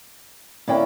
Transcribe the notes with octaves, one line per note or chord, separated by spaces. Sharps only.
D3 A#3 C#4 E4 D5 G5